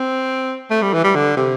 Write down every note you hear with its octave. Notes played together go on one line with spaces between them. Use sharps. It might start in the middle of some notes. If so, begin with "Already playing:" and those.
Already playing: C4
A3
G3
E3
G3
D3
C3